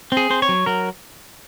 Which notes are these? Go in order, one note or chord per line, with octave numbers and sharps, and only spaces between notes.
C4 G#4
C4 C5
C#5
F#3
F#3 A#4